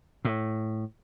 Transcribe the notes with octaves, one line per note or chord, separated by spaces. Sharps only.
A2